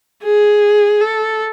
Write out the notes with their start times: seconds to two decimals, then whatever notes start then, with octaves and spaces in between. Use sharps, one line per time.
0.23 G#4
1.01 A4